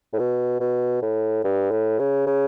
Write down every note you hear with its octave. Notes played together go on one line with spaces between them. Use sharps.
A2
B2
B2
A2
G2
A2
C#3
C#3